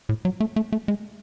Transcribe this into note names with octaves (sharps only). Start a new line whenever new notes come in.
A2
F#3
A3
A3
A3
G#3